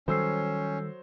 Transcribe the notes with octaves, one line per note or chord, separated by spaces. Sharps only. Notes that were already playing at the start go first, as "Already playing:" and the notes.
D#3 F#3 G3 C#4 A4 C5 E6 C7